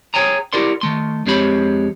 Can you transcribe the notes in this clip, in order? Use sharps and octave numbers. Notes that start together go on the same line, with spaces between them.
G#4 C5 C#5 G5 G#5 A#5
E4 G4 A#4 D5 F#5 C6
D#3 A3 C6
F2 G#3 C4 G4 C#5 B5